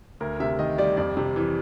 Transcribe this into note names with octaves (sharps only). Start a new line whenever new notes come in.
D2 A#4
C3 E5
D#3 D#5
G3 D5
F2 D5
C3
E3